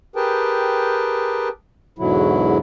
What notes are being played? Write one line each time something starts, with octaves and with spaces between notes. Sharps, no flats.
G4 G#4 A#4 B4 G5 A5
E2 G#2 B2 D3 F#3 E4